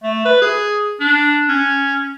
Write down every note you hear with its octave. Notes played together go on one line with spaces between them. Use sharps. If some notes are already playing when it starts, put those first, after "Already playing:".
A3
B4
G#4
D4
C#4